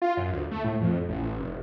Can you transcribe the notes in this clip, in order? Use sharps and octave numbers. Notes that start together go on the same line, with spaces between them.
F4
F#2
D2
A3
A2
F2
A1
A1
F1